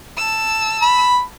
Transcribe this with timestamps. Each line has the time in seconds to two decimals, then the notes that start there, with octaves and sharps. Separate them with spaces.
0.16 A5 E6
0.82 B5